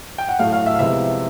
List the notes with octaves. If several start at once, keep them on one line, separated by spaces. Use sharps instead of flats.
G5
F#5
A2 F#3 A3 F5
F5
E5
F5
C3 F3 G#3 B3 E4 E5